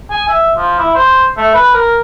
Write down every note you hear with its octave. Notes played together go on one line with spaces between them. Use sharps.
G#5
E5
F3
E4
C5
A3
B4
A#4